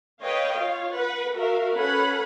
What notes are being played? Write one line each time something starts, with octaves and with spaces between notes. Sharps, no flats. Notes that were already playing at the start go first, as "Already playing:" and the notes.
B4 C#5 D#5 F5 G5
F4 C#5 F5
B4 F#5
F#4 A#4 E5 F5
C#4 A4 B4 F#5 B5